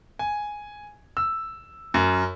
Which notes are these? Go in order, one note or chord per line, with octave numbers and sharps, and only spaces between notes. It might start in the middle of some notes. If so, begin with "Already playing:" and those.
G#5
E6
F#2